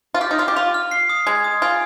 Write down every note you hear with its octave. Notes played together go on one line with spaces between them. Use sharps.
F4
G4 F6
D#4
F4 F6
G4
F4 F7
F6
C7
D#6
G#3 G#6
D#6
F4 G#5